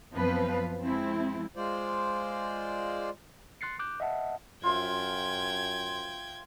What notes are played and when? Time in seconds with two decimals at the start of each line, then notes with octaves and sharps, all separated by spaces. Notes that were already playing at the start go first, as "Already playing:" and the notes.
0.12 F#2 F3 B3 C4 B4 F5
0.81 F3 G#3 C4 E4
1.56 G#3 F4 C5 D5
3.61 C6 F#6 A6 C7 C#7
3.79 D6 F#6 G6
4.00 D#5 E5 F#5 A5
4.63 F#2 F4 C5 E5 G5 G#6